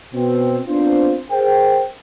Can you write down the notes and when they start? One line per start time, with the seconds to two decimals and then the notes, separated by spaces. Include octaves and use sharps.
0.14 B2 C4
0.67 B3 C4 D4 F4 C5
1.31 G#4 A#4 C5 G5